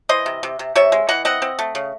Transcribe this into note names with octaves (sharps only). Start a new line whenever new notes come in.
E3 C5 D#5
C3
C3
C3
C3 C#5 E5
G#3
E3 D#5 F#5
C4 D#5 F#5
C4
A3
C#3